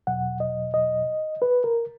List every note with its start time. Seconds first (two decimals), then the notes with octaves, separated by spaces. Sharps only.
0.07 E2 B2 F#3 F#5
0.40 D#5
0.74 D#5
1.42 B4
1.64 A#4